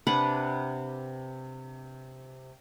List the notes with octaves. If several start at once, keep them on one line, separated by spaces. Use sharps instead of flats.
C3 D4 B4 F#5